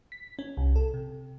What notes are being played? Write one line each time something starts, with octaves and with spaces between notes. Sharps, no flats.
B6
C#4
C2
A4
C3